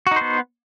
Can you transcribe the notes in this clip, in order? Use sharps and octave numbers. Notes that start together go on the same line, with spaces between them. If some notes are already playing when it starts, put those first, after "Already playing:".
B3 D#4 F#4 C5